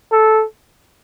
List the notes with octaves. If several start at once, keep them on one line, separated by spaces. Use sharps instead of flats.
A4